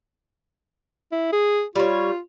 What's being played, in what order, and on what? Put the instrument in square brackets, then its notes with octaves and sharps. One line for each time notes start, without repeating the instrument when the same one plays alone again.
[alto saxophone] E4
G#4
[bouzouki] G3 C#5 [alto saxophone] F4